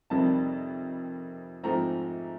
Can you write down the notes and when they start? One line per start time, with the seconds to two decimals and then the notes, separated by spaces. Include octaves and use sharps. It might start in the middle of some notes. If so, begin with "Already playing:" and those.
0.10 F2 C3 D#3 G3 C4 A5
1.63 G#2 F3 A3 C4 A#5